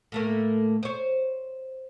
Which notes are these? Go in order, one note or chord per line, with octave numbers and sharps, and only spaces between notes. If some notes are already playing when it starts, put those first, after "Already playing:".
A2 A3 A#3
C5 C#5